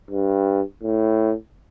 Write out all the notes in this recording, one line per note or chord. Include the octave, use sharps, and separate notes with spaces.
G2
A2